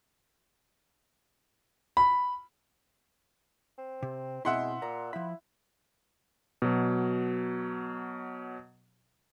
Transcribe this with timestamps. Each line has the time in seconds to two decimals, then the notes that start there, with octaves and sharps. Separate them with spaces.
1.97 B5
3.78 C4
4.02 C3
4.45 B2 G#3 C4 E4 E5 F#5 C6
4.82 A#2 A#5
5.13 F3 E4 B5
6.62 B2 F#3